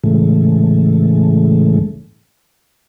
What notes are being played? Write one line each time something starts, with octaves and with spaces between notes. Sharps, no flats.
A2 C#3 E3 G#3 A3